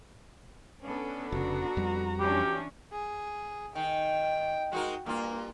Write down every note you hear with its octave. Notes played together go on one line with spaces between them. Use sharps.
B3 C#4 D4 A4
F1 C#3 F#4 A#5
F2 G3
E3 C#4 D4 G4
G#4
D#3 G5
G#3 D#4 F#4 A#4
G2 A#3 F4